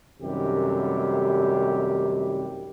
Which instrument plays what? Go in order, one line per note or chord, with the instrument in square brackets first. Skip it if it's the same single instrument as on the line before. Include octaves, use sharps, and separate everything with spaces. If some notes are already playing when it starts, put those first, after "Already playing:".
[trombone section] F#2 C3 D#3 G3 A3 G4